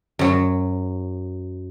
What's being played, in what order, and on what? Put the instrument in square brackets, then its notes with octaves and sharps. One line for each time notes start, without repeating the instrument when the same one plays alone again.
[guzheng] F#2 F#3